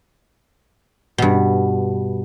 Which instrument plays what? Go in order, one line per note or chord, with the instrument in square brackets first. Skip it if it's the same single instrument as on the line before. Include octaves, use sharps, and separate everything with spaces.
[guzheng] G2 B2